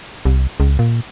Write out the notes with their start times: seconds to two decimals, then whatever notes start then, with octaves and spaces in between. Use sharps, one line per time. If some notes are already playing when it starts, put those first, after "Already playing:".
0.25 C2
0.60 C#2
0.79 A#2